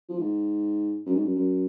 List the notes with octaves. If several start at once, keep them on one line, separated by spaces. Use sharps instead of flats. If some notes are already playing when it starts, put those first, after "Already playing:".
F3
G#2
F#2
G#2
F#2
F#2